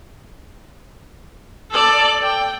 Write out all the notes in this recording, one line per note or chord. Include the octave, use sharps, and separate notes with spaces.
A4 D5
G5